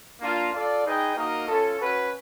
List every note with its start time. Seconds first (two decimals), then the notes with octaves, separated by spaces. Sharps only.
0.21 A#3 D4 F4
0.53 F4 A4 D5
0.84 D#4 G#4 B4 D#5 G5
1.15 A#3 D#4 F#4 A#4 D#5
1.47 C#4 F4 A4
1.79 C#4 F#4 B4